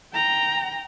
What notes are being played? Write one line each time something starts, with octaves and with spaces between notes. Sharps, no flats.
G5 A#5